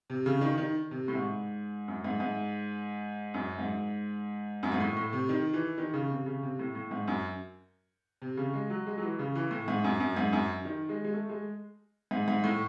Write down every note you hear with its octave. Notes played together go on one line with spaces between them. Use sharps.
C3
C#3
D#3
D#3
C3
A2
G#2
F#2
G#2
G#2
F#2
G#2
F#2
G#2
A2
A2
C3
D#3
E3
D#3
C#3
C3
C#3
C3
A2
A2
G#2
F#2
C3
C#3
G#3
F#3
G#3
F#3
E3
C#3
E3
A2
G#2
F#2
F#2
G#2
F#2
D#3
G#3
G#3
A3
G#3
G#2
G#2
A2